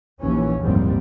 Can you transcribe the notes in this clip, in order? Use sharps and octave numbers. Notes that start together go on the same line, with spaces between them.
A#1 D#2 E3 C#4
F#1 D#2 G#2 F3 G3 C4